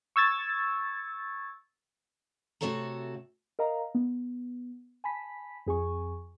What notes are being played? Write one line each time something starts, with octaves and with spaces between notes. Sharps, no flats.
C#6 E6 G#6 A6
C3 A3 F#4 A4 C#5 A#5
A#4 D#5 F5 A#5
B3
G#5 A5 B5 B6
F2 G#4 G#5 C#6